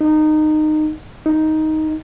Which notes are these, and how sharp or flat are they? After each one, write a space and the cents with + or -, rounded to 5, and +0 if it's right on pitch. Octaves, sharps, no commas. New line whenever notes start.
D#4 -20
D#4 +5